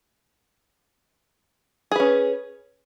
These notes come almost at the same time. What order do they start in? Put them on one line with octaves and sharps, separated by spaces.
G#4 B4 C#4